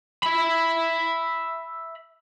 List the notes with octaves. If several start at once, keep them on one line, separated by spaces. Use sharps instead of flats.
E5 B5